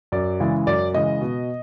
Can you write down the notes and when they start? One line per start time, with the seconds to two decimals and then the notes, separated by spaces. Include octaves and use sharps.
0.12 F#2 D5
0.40 C#3 E3 G#3
0.67 F#2 D5
0.94 C#3 E3 G#3 D#5
1.21 B2